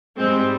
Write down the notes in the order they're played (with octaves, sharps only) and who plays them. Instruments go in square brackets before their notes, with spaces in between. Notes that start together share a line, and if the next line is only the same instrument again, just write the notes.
[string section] G#2 G3 G#3 C4